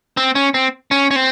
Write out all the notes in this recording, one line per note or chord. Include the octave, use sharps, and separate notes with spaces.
C4
C#4
C4
C#4
C#4
C4